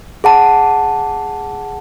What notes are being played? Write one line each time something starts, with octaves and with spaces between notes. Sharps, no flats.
G#4 F#5 A5